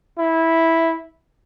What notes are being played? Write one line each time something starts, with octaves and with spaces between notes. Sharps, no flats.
E4